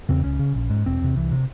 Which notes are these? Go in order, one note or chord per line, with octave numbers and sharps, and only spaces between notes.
E2 C#3 C4
C#2 C#4
C#3
A#1
G#2
E1 C4
E2 C3
C2 E3
C3